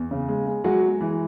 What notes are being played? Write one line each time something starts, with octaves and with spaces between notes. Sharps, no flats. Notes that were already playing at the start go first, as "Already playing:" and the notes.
Already playing: E2
C#3
G#3
G#3
F#3 G#3 F#4
G#3
E3